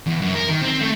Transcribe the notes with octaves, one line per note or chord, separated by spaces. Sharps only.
E2
F#2
A#4
D#3
C4
A3